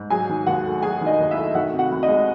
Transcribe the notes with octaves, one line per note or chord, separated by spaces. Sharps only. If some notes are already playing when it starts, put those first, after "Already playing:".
Already playing: G#2
F#3 G#4 G#5
D#3
D#2 F#4 F#5
A3
F#3 G#4 G#5
D#3
D#4 D#5
D#2
E4 E5
A3
D#3 F#4 F#5
C3
F#4 F#5
C2
D#4 D#5
G#3